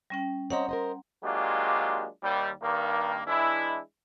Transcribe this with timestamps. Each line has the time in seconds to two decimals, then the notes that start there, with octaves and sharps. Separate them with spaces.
0.10 G3 C#4 G5
0.50 C4 C#5 D#5 F#5 A#5 C6
0.69 A#4 C5 D#5
1.24 F#3 G#3 A#3 D4 F4 G4
2.23 D#2 G3
2.62 G2 D#3 A#3
3.27 E3 G#3 D4 E4